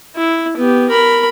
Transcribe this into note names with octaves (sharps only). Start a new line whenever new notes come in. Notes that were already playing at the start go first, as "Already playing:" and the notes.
E4
B3 G4
A#4 B5